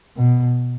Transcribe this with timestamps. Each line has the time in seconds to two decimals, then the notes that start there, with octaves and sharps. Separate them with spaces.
0.17 B2